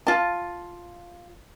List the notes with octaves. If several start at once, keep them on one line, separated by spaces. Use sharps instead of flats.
F4 A5